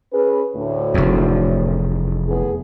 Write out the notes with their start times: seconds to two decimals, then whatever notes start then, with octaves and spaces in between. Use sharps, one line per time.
0.12 C#4 G#4 B4
0.56 D2 A2
0.94 F1 E2
2.28 A2 B3 G#4